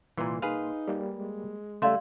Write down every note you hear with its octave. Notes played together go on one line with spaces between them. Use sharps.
C2 A#2 E3 A#3 C6
D#4 G#4 B4 F5
G3 A#3
G#3
C#3 G3 A3 D5 E5 F5 C6